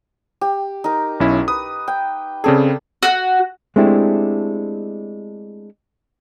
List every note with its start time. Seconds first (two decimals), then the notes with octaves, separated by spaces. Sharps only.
0.41 G4
0.84 D#4 A#4
1.20 B1 C#4 E4
1.48 B4 D#6
1.88 G5
2.44 C#3 C4 G#4 A4 D5
3.03 F#4
3.76 G#3 A3 C4 D4 E4 G4